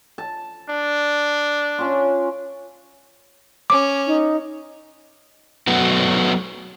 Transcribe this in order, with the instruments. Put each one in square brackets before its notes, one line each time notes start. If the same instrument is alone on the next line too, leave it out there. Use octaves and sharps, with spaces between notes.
[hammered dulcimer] A5
[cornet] D4
[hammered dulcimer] C#4 F4
[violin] C#4 [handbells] D6
[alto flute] D#4
[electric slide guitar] F#3 A3 B3 F#4